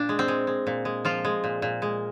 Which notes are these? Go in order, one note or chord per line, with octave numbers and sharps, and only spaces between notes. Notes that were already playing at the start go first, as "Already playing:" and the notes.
Already playing: A#2 D4
G#3
C4
G#3
G#3
A#2
G#3
F3 F4
G#3
A#2
A#2
G#3